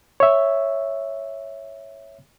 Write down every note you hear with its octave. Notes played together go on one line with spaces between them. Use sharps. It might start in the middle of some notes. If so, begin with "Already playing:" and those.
C#5 E5